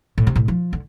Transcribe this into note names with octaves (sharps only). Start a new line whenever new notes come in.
A2
C3
A2
F3
D3